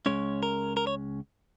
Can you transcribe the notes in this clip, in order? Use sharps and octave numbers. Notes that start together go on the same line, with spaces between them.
C#2 C#3 G#3 C#4 C#5
A#4
A#4
C#5